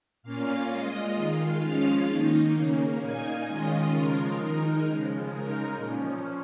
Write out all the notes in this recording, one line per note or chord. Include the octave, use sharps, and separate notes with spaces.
A#2 A#3 C#4 F4 F5
A#2 G#3 F4 D#5
D#3 G#3 F4
F3 G#3 C#4 F4 F5
D#3 A#3 D#4
C#3 A#3 C#4
A#2 A#3 D#4 G#5
D#3 G#3 C#4 F4 D#5
C#3 F3 G#3 F4 A#4
D#3 G#3 D#4 A#4
C#3 F3 G#3
C#3 G#3 D#4 A#4
A#2 F3 C#4